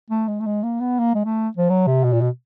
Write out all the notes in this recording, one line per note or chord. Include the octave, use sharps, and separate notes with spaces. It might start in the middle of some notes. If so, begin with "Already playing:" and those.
A3
G#3
A3
G#3
A#3
B3
A#3
G#3
A3
F3
F#3
C3
B2
A#2
B2